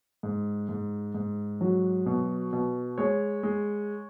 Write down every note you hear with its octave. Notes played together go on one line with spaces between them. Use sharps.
G#2
G#2
G#2
F#3
B2
B2
G#3 C#5
G#3